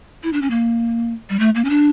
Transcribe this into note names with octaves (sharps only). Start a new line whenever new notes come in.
E4
D4
C#4
A#3
G3
A3
A#3
C#4
D4